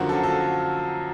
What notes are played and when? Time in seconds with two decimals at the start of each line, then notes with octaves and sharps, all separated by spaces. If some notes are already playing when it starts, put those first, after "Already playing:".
Already playing: F#2 D3 F3 A#3 F4 F#4
0.09 A4
0.23 A4